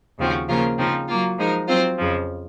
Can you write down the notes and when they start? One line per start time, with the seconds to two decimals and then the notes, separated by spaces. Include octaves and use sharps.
0.19 D#2 C#3 F3 C4 F#4
0.49 C#3 F3 A#3 F4 A#4
0.78 C#3 F3 C4 D#4
1.08 F#3 A#3 F4
1.38 F3 G#3 D#4 A#4
1.68 F#3 C4 F4 C5
1.98 F2 C#3 F3